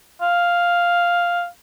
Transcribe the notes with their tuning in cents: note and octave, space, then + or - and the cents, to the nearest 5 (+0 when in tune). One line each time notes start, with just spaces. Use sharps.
F5 +0